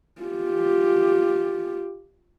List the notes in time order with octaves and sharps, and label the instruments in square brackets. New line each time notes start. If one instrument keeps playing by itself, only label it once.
[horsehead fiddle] F4 G4